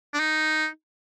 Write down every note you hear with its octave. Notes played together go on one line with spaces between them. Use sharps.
D4
D#4